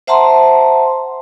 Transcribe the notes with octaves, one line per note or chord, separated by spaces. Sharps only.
C5 E5 F#5 A5 A#5 C6